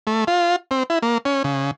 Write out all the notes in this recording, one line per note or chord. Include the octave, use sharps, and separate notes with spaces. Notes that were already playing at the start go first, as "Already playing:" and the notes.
A3
F4
C4
E4
A#3
C#4
C#3